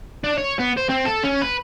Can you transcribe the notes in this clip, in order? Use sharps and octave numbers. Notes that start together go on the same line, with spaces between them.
D4
C#5
B3
C5
C4
A4
C#4
B4